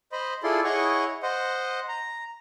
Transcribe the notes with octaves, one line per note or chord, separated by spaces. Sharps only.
C5 D#5 B5
E4 F4 G#4 A4 D5 C6
E4 G#4 C#5 D#5 F#5 C#6
C5 D#5 F#5
A#5